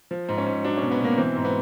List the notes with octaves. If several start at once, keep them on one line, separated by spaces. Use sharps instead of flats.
F3
G#2
C#4
G#2
F#3 D4
B2 C#4
B3
B2 A#3
E3 C4
G#2
B3